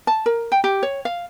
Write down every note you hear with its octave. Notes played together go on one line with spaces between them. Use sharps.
A5
A#4
G5
G4
C#5
F5